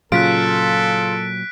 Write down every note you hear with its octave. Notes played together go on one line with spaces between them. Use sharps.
A#2 C#3 F#3 F4 A4 F#6 B6 D7